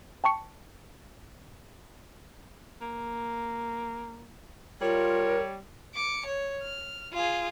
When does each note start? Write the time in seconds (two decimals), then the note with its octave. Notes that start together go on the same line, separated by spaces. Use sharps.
0.24 G5 A5 C#6 C#7
2.81 A#3
4.81 G3 F4 A#4 C#5
5.94 D6 C#7
6.26 C#5
6.62 F6
7.13 F4 G#4